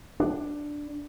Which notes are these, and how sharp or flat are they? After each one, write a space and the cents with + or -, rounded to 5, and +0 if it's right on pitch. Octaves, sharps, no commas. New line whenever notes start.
D4 +0